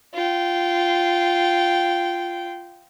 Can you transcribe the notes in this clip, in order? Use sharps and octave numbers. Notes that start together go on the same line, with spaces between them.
F4 G5